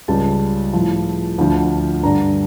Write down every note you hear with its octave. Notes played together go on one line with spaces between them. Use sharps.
C#2 C#3 G3 A5
A2 F3
D2 D3 F3
G2 D3 G3 A#5